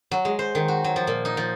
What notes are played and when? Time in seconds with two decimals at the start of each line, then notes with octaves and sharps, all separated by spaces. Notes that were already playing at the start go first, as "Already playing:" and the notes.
0.11 F#3
0.25 G#3
0.39 C5
0.55 D#3
0.68 F#4
0.84 F#3
0.96 F3
1.07 A#2
1.25 D#4
1.37 F3